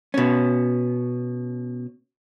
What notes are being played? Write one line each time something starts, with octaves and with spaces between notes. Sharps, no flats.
B2 C#4